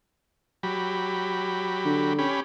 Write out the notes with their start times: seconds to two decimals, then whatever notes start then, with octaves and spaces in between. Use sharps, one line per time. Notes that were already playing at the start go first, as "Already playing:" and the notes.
0.63 F#3 G4 B5
1.85 D3
2.19 C#4 G4 B5